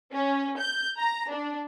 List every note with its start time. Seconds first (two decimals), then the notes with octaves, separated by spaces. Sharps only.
0.12 C#4
0.59 G6
0.99 A#5
1.31 D4